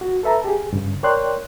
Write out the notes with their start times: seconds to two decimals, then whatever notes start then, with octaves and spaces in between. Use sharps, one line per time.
0.01 F#4
0.23 A4 B4 E5 A5 A#5
0.44 G4 G#4
0.73 G2 C#3
1.03 A#4 C#5 D5 G5 C6 F#6